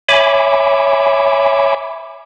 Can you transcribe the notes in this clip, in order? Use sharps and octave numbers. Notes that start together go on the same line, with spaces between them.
C#5 E5 G#5 B5 D6